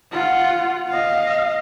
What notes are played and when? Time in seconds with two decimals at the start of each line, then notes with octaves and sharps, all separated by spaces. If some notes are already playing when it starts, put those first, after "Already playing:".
0.12 F4 F#5
0.89 D#5 F5